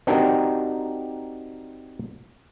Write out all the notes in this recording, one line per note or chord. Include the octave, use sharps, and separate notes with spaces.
C4 D4 D#4 F#4 G4 A#4